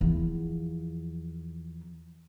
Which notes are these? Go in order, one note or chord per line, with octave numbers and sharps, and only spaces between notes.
E2 F3